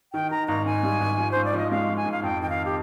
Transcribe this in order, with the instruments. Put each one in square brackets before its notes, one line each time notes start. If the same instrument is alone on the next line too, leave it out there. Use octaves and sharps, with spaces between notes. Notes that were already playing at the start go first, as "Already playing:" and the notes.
[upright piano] D#3 [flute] G5
[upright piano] D#3 [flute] A#5
[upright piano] G#1 [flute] A#5
[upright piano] G#2 [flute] G#5
[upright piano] G3
G#1
F3
[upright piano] G#2 [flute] C5
[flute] D5
[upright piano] F3 [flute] D#5
[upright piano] G#3 [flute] F5
[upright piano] F3
[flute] G#5
[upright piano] G#2
[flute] F5
[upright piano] F2 [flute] G5
[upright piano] D#3 [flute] G5
[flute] F5
G4